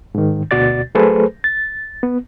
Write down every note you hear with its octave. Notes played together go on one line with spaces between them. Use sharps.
G#2 D#3
D2 B2 F#4 D5 A6
F#3 A3 G#4 A4 B4 C5
A6
B3